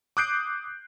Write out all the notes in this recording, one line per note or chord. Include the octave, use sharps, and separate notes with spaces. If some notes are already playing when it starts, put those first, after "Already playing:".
D6 D#6 F#6 G6 C7 D7